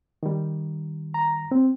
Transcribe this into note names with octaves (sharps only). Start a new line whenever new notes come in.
D#3 G3
A#5
C4